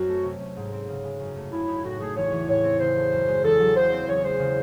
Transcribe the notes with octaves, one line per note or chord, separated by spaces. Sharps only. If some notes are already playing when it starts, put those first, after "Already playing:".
Already playing: F#2 C4 F#4
A3
C3
C#4
G#2
C4
C#3
G#3
F#2
A3
C#3 E4
D#4
A2 F#4
A3 G#4
E2 C#5
E3
A2 C#5
C4
C#3 C5
A3
F#2
G#3
E2 A4
F#3
C#3 C5
C4
E2 C#5
G#3 C5
C#3